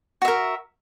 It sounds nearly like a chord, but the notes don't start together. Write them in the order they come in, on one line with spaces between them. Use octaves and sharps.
F#4 E5 A#4